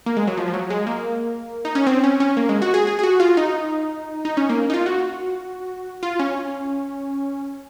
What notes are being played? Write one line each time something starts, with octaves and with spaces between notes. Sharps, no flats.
A#3
G#3
F#3
F3
F3
F#3
G#3
A#3
D#4
C#4
C4
C#4
C#4
A#3
G#3
F#4
G#4
G#4
G#4
F#4
F4
D#4
D#4
C#4
A#3
D#4
F4
F#4
F4
C#4